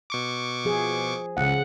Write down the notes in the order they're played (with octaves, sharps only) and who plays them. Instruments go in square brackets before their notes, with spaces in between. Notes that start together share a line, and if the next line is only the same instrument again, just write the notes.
[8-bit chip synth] B2 C#6 D6
[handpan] F3 G#4
[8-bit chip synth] C#2 [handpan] C#3 F#5